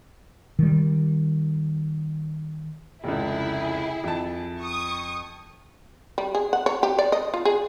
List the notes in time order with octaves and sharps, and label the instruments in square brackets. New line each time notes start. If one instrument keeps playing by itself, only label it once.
[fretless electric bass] D#3 G3
[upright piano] F1 C#2 [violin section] E4 G#4
[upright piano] F2 A5
[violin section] C#6 D#6
[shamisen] G3
G#4
F#5
C#5
G4
D5
D#5
F4
G#4